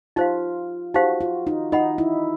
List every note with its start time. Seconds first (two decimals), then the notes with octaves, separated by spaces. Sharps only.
0.16 D#4 F4 G4 C5 F5
0.94 D#4 F#4 G4 C5 F5
1.21 F4
1.47 D#4
1.72 D#4 A#4 D#5 F#5 B5
1.98 E4